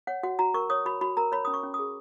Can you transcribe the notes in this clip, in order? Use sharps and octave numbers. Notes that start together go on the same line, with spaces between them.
C#5 F#5
F#4 F#5
F#4 A#5
A#4 C#6
C#5 D#6
F#4 B5
F#4 B5
A#4 A#5
C#5 B5
C#4 D#6
C#6
C#4
G#4 D#6